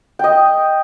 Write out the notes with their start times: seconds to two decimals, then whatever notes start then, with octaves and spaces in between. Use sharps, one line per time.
0.19 D#5 G5